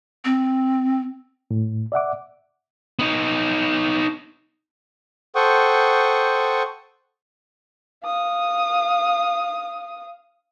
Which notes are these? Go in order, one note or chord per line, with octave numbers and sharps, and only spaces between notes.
C4
A2
D5 E5 F#5 D6
B3 D#4
A4 C5 F#5 G5 C#6 D#6
F5 D#6